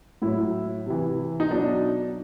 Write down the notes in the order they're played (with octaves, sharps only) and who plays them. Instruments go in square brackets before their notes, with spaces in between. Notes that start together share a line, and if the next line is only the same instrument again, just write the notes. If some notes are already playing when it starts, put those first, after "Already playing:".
[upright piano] A2 F#3 E4
C3 E3
D#4
B2 F#3 D4